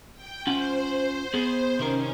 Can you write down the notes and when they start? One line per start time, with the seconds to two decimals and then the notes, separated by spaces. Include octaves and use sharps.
0.14 G5
0.47 C#4 F4 C5 F#5
1.34 B3 G#4
1.79 C3 D#3 C#4 A#4